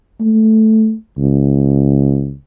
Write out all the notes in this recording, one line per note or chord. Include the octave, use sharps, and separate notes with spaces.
A3
C#2